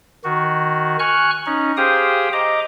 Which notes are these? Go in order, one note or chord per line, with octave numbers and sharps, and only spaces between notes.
D#3 F#4
G#5 C#6 F6 F#6
C#4 D#4
G4 G#4 C5 F5 G5 D#6
D#5 A#5 D6